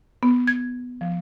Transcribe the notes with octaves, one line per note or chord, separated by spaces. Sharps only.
B3
G#6
F3